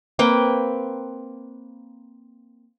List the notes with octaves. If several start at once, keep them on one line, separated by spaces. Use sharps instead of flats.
A#3 C4 B4 G5